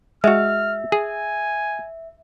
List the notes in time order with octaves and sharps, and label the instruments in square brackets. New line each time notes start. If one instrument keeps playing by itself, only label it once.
[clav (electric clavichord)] G#3 F#4 [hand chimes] E5 [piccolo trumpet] F6
[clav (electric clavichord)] G#4 [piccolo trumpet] G#5